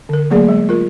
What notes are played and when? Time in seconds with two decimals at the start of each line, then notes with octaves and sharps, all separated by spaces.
0.09 D3 A#4
0.30 F#3 A3 A#3 G#4 D5
0.49 G#3
0.69 F4 A#4